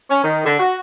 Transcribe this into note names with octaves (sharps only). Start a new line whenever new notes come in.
C#4
D#3
D3
F#4